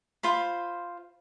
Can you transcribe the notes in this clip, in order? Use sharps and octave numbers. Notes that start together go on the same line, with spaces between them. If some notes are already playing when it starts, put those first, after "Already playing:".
F4 C5 B5